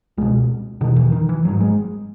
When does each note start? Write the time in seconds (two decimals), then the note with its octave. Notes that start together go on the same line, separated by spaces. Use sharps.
0.18 C#2 B2 G#3
0.81 E1 E2 B2 D#3
0.96 E3
1.12 D#3
1.29 E3
1.44 G#1 F#3
1.49 G#2
1.61 G#3